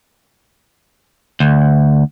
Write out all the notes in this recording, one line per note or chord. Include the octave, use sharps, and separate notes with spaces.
D2